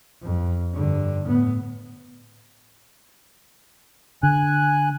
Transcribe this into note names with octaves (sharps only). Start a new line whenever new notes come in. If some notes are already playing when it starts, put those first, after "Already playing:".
F2
G2 D3
A2 B3
D3 G#5 F#6